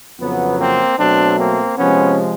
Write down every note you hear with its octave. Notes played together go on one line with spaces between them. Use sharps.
F2 C#3 F#3 B3
A#3 C4
B2 F#3 A3 C4 D4
A#3 C4
C3 F3 G#3 B3 C#4